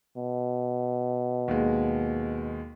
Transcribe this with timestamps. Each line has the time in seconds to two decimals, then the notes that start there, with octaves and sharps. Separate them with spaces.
0.17 B2
1.48 D#2 G#3